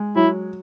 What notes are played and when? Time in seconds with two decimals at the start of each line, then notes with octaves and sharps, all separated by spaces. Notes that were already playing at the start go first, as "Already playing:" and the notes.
Already playing: G#3
0.16 F#3 E4